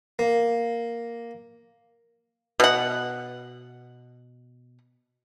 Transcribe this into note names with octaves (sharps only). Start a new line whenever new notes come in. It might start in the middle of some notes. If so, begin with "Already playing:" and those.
A#3
B2 F#5